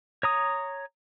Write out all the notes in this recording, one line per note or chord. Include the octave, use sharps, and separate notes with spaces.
C#5 A#5 D#6